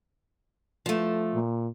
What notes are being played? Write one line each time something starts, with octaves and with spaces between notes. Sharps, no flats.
F3 A3
A#2